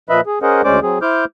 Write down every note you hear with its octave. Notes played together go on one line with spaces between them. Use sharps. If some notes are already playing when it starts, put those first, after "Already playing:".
A#2 F3 B4 D#5 E5 B5
G#4
C#4 G#4 A#4 C5 D#5 F#5
D2 G#3 C#4 C5 D5 D6
F#3 C4 G#4
E4 C5 D6 F6 G6